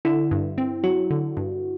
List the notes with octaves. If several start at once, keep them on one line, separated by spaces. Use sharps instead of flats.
D3 E4
G2
C4
F#3 F#4
D3
G2